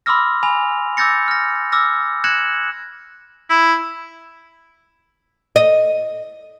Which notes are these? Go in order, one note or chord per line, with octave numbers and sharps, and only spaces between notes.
B5 C6 D6 E6 F6 A#6
G#5 B5 F7
D6 E6 G6 A6 A#6 C#7
F6 A#6
D6 E6 F6 A#6
F#6 G#6 A#6 C#7 E7 F#7
E4
D#5